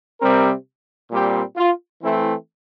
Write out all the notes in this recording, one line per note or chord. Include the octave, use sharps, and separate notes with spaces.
C3 G3 C4 A#4
A#2 G3 C4 G4
F4
E3 A3 C4 E4